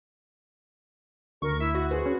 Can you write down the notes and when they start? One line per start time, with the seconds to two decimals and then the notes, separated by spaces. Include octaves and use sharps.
1.42 D2 A#4 C#6
1.60 E4 E5
1.75 F#4
1.91 G#4 B4 C5
2.06 C#4